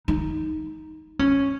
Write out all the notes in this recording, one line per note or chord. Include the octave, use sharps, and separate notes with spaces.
D#4
C#4